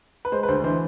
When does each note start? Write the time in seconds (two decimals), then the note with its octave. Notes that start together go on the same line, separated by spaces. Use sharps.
0.25 B4
0.32 G#3 C5
0.43 B4
0.48 D2 C5
0.64 E3 C5